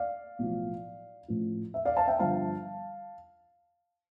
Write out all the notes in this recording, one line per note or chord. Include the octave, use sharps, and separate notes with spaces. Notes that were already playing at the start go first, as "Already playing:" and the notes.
Already playing: D5 F5
B1 A2 F3
A1 A2 F3
E5
D5 F5
F5 A5
E5 G5
G1 G2 D3 F3 F5 A5